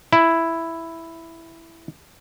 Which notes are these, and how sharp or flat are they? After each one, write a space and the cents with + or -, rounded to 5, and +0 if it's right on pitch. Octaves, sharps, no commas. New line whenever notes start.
E4 +0